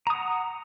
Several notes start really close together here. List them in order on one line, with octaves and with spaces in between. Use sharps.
A#5 D#6 F#5